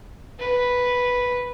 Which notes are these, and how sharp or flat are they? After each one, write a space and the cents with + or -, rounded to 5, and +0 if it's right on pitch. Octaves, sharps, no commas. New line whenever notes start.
B4 -5